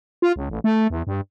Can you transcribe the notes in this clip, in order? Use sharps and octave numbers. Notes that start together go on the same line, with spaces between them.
F4
C#2
A1
A3
E2
G2